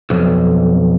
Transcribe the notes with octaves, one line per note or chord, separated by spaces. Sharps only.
B1 F2